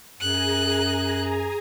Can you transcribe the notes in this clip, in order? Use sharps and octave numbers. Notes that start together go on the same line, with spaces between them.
F#2 G#4 G#5 A#5 F#6